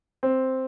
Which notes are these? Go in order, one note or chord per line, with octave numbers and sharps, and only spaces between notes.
C4